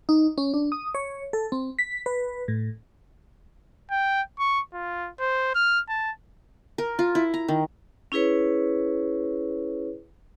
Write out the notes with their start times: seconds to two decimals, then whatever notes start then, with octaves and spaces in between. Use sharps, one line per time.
0.09 D#4
0.38 C#4
0.54 D4
0.72 D#6
0.95 C#5
1.33 A4
1.52 C4
1.79 B6
2.06 B4
2.48 A2
3.91 G5
4.39 C#6
4.74 F4
5.20 C5
5.55 F6
5.89 A5
6.78 A#4
6.99 F4
7.15 E4
7.34 A#5
7.48 D#3
8.12 C#4 E4 G#4 B4 C#5